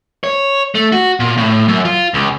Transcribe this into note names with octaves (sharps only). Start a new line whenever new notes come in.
C#5
A3
F#4
A#2
A2
F#2
F4
C#2